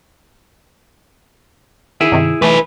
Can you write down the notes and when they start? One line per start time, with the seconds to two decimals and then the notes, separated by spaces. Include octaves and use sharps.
2.01 D#3 E4 G#4 E5
2.12 G2 C3 D#3
2.42 E3 A3 D#4 B4 G#5